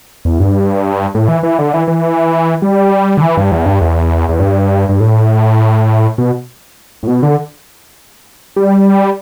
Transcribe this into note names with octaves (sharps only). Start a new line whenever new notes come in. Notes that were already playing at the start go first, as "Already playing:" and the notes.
E2
G2
A2
E3
E3
D3
E3
E3
G3
D3
E3
G2
E2
G2
E2
E2
G2
G2
A2
B2
A2
B2
D3
G3